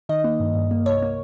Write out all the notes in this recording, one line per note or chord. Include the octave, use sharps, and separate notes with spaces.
D#3 D#5
A#3
G2
G2
A#3
C2 C#5
A#3